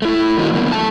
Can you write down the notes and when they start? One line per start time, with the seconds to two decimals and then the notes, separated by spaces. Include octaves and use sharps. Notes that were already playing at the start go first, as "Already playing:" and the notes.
0.02 A3 E4
0.38 D#3 G3 A#3 D#4 F#4
0.53 F#2 D3 E3 A#3 B3
0.72 A3 A5